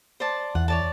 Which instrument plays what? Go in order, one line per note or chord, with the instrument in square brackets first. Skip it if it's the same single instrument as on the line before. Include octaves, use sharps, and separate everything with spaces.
[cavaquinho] C5 D5 A5
[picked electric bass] E2 [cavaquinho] F#5
[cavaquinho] C#5 D5 A5